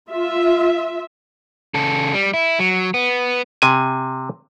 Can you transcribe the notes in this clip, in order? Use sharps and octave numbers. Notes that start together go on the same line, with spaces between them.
F4 E5
C#3 A4
G3
E4
F#3
B3
C3 G#5